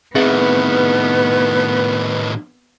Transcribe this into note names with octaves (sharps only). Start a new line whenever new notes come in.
A2 D#3 B3 C4 G#4 B4 E5